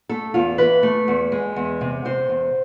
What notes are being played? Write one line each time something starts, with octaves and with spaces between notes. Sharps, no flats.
A3 A4
E2 F4
E3 B4
A3
E2
G#3
E2
C3
C3 C5
E2